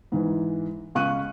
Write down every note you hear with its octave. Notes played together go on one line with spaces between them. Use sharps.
G#2 E3
C#2 F5 C#6 F#6 D#7